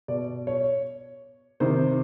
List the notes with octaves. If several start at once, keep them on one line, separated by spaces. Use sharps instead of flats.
B2 D5
C#5
C3 D#3 C5